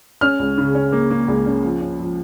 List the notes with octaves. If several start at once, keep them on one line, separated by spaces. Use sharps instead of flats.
C#4 F6
C#2
C#3
C#4
A#3
A#3
C#2
C#4
F3
C#4
F3